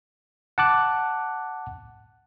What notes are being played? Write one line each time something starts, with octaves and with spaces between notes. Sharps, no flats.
F#5 A5 D6 F#6